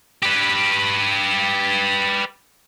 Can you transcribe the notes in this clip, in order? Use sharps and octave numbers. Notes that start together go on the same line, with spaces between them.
G4 B4